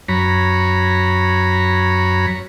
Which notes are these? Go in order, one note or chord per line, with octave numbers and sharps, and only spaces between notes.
F#2 C#5 A#5 B5